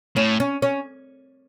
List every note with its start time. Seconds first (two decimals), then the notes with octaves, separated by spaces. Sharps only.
0.16 A2 C#4
0.40 C#4
0.62 C#4